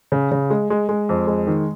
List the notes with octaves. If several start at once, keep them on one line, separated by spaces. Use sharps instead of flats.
C#3
C#3
G#3
G#3
G#3
F2
G#3
D#3